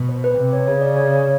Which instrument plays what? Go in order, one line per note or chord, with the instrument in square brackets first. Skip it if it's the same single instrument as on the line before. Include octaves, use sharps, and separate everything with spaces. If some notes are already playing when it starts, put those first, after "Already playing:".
Already playing: [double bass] B2
[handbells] C5
B4
[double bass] C3 [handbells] B4
[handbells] C#5
[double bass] C#3 [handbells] C#5
[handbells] D5
C#5